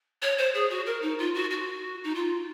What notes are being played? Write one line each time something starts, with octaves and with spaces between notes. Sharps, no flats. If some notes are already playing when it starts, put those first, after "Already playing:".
C#5
C5
G#4
F#4
A#4
D#4
F4
F#4
F#4
D#4
F4